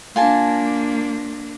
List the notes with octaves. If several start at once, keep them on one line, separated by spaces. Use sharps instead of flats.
A#3 D4 F4 G#5 A5